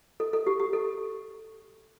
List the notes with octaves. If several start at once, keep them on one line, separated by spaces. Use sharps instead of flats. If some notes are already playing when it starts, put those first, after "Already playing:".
A4
A4
G4
G4
A4